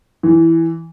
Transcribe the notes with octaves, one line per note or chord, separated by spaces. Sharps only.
E3